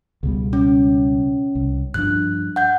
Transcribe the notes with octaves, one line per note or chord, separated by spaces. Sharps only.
C#2 B2 G3
C#4
C2
G2 F3 D4 F#6
F#5 G6